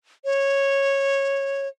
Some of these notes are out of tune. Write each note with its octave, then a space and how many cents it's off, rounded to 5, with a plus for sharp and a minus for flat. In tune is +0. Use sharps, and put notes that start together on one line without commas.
C#5 -10